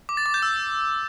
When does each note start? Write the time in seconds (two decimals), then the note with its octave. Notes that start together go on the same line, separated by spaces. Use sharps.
0.09 D6
0.17 A6
0.26 D6
0.34 G6
0.43 E6